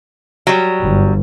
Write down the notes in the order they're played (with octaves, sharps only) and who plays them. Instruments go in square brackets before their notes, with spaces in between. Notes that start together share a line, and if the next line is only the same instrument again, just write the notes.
[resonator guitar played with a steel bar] F#3 G3
[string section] G1